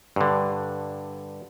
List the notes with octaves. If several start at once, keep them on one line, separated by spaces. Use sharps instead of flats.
G2 D3